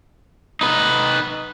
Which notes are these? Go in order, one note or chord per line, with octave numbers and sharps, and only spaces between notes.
D#4 B4